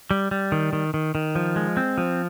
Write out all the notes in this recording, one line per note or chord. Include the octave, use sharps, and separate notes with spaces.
G3
G3
D#3
D#3
D#3
D#3
F3
G#3
C4
F3